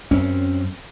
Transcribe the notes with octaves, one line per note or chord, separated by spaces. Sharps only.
F#2 C4 C#4